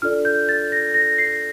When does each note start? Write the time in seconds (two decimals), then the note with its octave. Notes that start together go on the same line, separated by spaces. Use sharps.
0.02 D4 F4 A4 D5 F6
0.25 G6
0.49 A6
0.72 A#6
0.94 A#6
1.18 C7